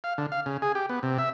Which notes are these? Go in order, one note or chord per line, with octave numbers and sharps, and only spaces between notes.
F5
D3
F5
C#3
G#4
G4
B3
C3
E5